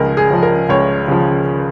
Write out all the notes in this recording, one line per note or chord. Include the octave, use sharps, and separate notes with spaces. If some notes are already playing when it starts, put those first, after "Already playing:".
Already playing: C#2 C#3 F3 G#4 A#4
G#4
C#3 F3
A#4
C#2 C#5
C#3 F3